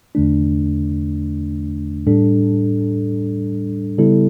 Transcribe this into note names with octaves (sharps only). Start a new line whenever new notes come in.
E2 D3 A3 D4
A2 G3 D4 A4
C#3 G3 B3 E4 A4